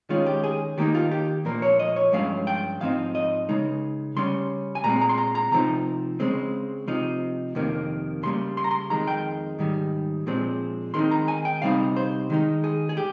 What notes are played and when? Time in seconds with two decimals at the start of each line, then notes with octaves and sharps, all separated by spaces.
0.09 D#3 G#3 C#4 F4
0.26 G4
0.44 G#4
0.78 D#3 A#3 D#4 G4
0.95 F4
1.11 G4
1.45 A#2 F3 A#3 A#4
1.62 C#5
1.79 D#5
1.96 C#5
2.12 G2 F3 G#3 C#4 F5
2.47 G5
2.80 G#2 F3 C4 D#4 F5
3.15 D#5
3.49 C#3 G#3 D#4
4.16 C#3 G3 C#4 C6
4.75 G#5
4.84 A#2 G#3 C4 A#5
5.01 A#5
5.09 C6
5.18 A#5
5.35 A#5
5.51 C3 F3 C4 D#4 A#5
6.20 C#3 G#3 C4
6.88 C3 F3 C4 D#4
7.55 F2 C3 D#3 A#3
8.23 C#3 G3 A#3 C6
8.57 C6
8.64 A#5
8.71 C6
8.90 F2 D#3 G#3 A#5
9.07 G5
9.59 G#2 D#3 G3
10.27 A#2 F3 G#3 C4
10.94 D#3 G#3 C4 D#4 C6
11.11 A#5
11.28 G#5
11.45 G5
11.62 C3 G3 C4 D#4 F5
11.96 C5
12.30 D#3 G#3 D#4
12.64 G#4
12.89 G#4
12.97 G4